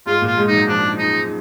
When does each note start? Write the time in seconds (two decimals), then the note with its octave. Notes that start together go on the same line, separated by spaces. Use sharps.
0.06 G#2 G#3 F4
0.22 A#2 A#3
0.27 F4
0.37 G#2 G#3
0.48 F#2 F#3 D#4
0.68 F3 D4
0.99 D#4